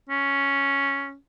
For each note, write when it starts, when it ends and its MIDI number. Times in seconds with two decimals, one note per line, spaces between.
0.09 1.16 61